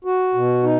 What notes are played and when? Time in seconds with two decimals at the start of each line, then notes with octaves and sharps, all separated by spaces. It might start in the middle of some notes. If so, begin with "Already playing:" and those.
0.05 F#4
0.34 B2
0.63 D#4